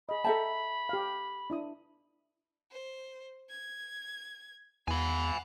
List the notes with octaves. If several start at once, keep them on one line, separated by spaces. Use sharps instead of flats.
G#4 D#5 B5
A4 E5 G5 A5 A#5
G4 F5
D4 E4 D#6
C5
G#6
E2 F5 F#5 G#5 B5